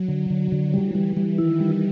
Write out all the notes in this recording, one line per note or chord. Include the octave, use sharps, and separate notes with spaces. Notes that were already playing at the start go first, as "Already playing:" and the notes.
Already playing: F#3
D3
D3
D3
E3 G3
G3
G3
D#3 E4
G3